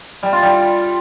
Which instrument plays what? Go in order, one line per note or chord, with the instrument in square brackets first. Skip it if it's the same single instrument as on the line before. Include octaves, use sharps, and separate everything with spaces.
[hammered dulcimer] G3
F4
G3